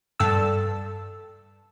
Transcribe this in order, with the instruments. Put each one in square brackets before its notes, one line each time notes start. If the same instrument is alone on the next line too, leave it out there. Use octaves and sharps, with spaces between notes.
[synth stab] G2 A4 A5 E6